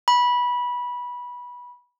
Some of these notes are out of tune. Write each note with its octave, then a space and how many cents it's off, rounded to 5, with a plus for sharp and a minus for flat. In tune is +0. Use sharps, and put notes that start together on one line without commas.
B5 -20